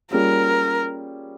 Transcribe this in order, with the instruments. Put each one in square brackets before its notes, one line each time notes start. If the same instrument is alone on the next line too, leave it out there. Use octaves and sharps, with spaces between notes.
[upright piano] G3 A#3 C#4 F4 G#4 [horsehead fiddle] A#4